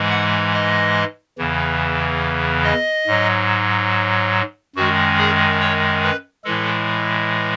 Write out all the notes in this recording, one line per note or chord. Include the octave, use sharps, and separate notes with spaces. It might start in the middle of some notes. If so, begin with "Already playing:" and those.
Already playing: G#2 E3 G#3
F#5
D#5
E2 C#3 E3
D#5
G#2 F#3
F#2 D#3 G#3 F#4
G#4
C#5
B4
A2 E3 G#3 A4